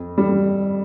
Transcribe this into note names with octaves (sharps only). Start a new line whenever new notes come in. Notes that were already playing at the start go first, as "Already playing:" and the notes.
Already playing: F2
G3